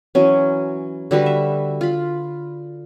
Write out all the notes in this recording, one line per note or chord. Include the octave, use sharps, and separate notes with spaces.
E3 F#3 C#4
D3 G3 F#4 B4
E5
F4 B5